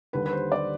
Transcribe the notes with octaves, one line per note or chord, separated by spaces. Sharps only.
D#2 D3 G3 B4
B4
C5
D5